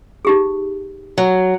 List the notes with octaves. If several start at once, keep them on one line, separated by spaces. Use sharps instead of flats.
D#4 G4 G#4
F#3